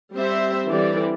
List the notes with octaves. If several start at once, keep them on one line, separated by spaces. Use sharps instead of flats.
G3 C4 C5 E5
D3 E3 G3 C4 D5